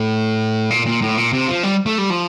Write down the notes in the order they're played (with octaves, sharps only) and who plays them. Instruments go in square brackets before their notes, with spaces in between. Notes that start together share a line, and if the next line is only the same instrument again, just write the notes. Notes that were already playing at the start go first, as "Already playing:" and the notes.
Already playing: [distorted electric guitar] A2
A#2
A#2
A2
A#2
C3
F3
G3
A3
G3
F3